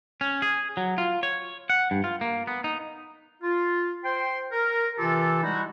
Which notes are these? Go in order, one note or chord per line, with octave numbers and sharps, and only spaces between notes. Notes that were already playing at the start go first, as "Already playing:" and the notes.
C#4
G#4
F#3
F4
C#5
F#5
G2
F4
A#3
B3
D#4
F4
C5 G5 C6
A#4
C3 E3 F4 G4 A4
G3 G#3 D#4 E4 F#4